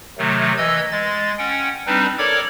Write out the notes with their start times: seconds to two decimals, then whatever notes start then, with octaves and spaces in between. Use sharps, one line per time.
0.18 C3 D#3 F#3 A3
0.58 E3 D#5 E6 G#6
0.92 G#3 A6
1.38 C#4 F#5 G5
1.87 G3 C4 D4 D#4 B4
2.18 A4 A#4 C#5 D5 D6 G#6